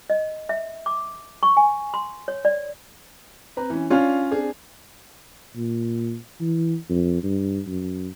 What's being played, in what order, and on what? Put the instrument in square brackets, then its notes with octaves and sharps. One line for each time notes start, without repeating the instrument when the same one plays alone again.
[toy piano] D#5
E5
D6
C#6
G#5
C6
C#5
D5
[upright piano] C4 B4 A#5
E3 C#4
[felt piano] C#4 F4 [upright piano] D4 F5 F6
[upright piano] C4 D4 G#4
[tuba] A#2
E3
F2
G2
F#2